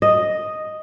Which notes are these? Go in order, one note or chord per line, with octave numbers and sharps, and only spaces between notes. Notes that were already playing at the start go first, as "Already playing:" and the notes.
D#5